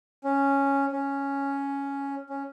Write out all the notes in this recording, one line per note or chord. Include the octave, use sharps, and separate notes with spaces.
C#4
C#4
C#4